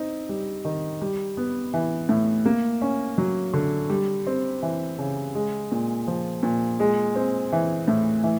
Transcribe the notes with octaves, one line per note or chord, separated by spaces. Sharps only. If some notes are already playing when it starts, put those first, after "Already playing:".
Already playing: C4 D#4
G3
D#3
G3
B3
E3
A2
A#3
C#4
F#3
D3
G3
C4
E3
C#3
G#3
A#2
F3
A#2
G#3
C4
E3
A2
E3